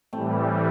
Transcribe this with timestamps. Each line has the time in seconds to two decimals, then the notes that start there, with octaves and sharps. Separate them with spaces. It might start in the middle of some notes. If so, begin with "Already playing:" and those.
0.13 A2 E3 G3 A3 C4